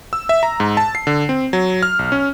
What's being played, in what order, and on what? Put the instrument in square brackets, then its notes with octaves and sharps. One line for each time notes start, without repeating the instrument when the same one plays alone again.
[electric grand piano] E6
E5
A#5
G#2
A5
C7
D3
C4
F#3
F6
B1
C#4